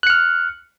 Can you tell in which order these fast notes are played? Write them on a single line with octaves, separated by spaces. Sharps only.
F#6 C#7 F6